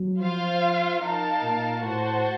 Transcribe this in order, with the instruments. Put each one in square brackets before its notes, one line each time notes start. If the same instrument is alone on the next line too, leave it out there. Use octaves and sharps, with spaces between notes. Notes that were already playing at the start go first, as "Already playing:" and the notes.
Already playing: [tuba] F#3
[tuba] F3 [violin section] F4 C5 F5
[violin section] D#4 A#4 F5 A5
[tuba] A#2
[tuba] A2 [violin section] F#4 C5 F#5 A5